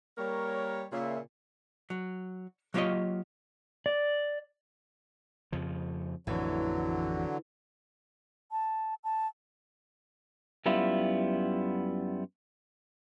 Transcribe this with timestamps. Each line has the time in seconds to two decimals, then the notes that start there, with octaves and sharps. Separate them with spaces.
0.17 G3 A#3 A#4 C#5
0.92 A#2 C#3 E5
1.90 F#3
2.74 F#3 A#3 F4 G4 C#5 D#5
3.86 D5
5.52 F2 C#3 F3
6.27 A1 F2 A2 D3 E3 F#3
8.52 A5
9.04 A5
10.66 F#2 G3 B3 E4 F4